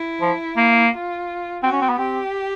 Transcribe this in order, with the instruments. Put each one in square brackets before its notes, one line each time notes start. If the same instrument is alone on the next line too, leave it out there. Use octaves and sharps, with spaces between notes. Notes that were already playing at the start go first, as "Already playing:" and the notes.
Already playing: [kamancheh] E4
[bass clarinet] F3
A#3
[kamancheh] F4
[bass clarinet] C4 [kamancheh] F#4
[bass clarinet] C#4
C4
B3
[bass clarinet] C4 [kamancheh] G4